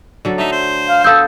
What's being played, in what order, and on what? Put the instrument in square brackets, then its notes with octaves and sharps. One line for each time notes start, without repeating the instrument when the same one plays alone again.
[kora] D3 F#3 A4
[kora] A3 E5 [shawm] D#4
[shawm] C5
[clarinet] F5
[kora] B3 A4 [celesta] F5 D#6 G6 [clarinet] E6